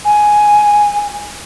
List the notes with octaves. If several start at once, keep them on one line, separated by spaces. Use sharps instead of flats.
G#5